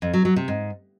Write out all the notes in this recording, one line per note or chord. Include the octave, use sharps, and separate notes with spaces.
F2
F#3
F#3
C3
G#2